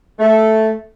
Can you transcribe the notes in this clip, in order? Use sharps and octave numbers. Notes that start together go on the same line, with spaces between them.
A3